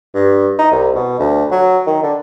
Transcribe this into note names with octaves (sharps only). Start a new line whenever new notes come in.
G2
D#4
C2
B2
D2
F#3
D#3
D3